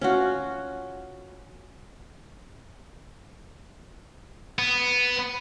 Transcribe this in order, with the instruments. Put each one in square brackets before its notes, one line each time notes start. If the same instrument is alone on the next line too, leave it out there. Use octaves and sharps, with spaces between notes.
[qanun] C#4 F4 F#4
[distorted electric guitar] B3